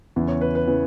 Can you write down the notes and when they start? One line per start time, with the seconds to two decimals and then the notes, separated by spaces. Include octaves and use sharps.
0.16 E2 C#3 E3
0.28 C#5
0.41 B4
0.55 B4
0.68 C#3 E3